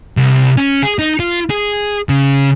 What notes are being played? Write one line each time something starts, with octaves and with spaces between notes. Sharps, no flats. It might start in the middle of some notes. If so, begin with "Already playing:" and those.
C2
C#4
G#4
D#4
F4
G#4
C#3